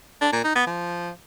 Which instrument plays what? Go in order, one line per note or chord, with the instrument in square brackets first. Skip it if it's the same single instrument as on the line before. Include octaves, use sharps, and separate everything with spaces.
[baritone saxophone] D4
A#2
D#4
B3
F3